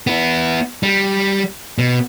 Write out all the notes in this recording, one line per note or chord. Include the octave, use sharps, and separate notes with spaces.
B3 E4
G3
B2